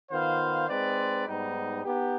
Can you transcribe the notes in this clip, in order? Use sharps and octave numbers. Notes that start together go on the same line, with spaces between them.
D#3 B3 F4 C5 F5
G#3 C4 D#4 B4 D5
G#2 G3 B3 D#4
B3 D#4 G4